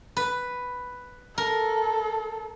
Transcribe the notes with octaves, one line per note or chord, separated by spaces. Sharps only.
B4
A4 A#4